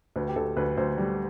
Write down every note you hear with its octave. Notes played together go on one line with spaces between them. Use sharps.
D2 B4
G4
D2 A4
D2 B4
D2 C5
G3